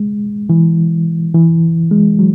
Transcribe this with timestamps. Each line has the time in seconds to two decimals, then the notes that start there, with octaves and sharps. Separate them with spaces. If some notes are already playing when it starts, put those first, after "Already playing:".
Already playing: G#3
0.49 E3
1.34 E3
1.91 G#3
2.19 F#3